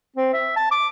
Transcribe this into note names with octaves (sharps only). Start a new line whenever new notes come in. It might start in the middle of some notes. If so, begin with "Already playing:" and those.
C4
E5
A5
D6